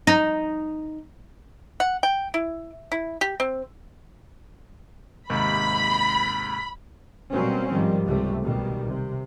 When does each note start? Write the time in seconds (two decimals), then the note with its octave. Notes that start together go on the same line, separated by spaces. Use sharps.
0.07 D#4
1.80 F#5
2.03 G5
2.34 E4
2.92 E4
3.21 G4
3.40 C4
5.30 D#2 G#2 C3 B5
7.32 B2 F#3 G3 A#3 C4 C#4
7.72 G#2 D#3 F3 G3
8.06 C#2 C3 G3 A3
8.43 B1 B2 D#3 G3
8.87 C3